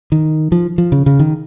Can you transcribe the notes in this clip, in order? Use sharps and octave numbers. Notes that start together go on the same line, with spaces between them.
D#3
F3
F3
C#3
C#3
D#3